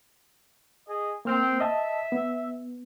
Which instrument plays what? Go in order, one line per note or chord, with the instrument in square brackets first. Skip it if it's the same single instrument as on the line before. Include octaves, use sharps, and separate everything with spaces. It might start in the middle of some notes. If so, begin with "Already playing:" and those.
[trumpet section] G#4 D#5
[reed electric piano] A#3 F6 [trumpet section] C4
[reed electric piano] D#5 A5 [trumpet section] E5
[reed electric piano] B3